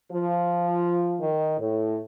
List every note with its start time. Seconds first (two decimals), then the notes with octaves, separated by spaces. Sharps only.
0.12 F3
1.21 D#3
1.59 A2